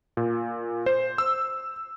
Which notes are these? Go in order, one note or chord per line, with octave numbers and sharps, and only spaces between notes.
A#2
C5
E6